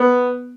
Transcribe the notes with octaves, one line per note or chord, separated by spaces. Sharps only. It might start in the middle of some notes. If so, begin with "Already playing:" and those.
Already playing: B3